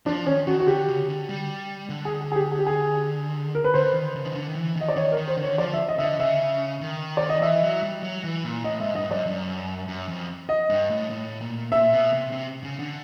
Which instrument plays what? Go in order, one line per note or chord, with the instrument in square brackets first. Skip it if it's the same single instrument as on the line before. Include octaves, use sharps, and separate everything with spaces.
[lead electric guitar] F3 [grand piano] D4
[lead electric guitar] D#3 [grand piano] C#4
[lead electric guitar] D#3 [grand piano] F#4
[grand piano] F#4
[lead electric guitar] D3 [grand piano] G4
[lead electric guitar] C#3
D3
G3
D3
[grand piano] G#4
G#4
G#4
G4
G#4
G4
G#4
A#4
B4
[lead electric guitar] D3 [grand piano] C5
[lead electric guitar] D#3
C#3
D#3
D3
D#3
E3
[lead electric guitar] D#3 [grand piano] D#5
[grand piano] D5
[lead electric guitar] D#3 [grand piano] C#5
[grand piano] A#4
[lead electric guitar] D#3
[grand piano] C5
[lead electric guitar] D3
[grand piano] C#5
[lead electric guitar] F3 [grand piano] D5
[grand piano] E5
D#5
[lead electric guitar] D3 [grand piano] E5
[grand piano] D#5
[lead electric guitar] C#3 [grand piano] E5
[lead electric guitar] D#3
[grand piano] D5
D#5
[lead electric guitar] E3 [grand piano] E5
[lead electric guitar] F#3
G3
F#3
E3
A#2
[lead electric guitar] A2 [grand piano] D#5
[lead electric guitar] G#2 [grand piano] E5
[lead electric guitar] G2 [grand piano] D#5
[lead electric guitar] F#2 [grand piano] D5
[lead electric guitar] F#2
F#2
F2
[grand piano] D#5
[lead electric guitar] G2
A2
A2
A#2
[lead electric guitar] A#2 [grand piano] E5
[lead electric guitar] B2
C3
C3
C#3
D3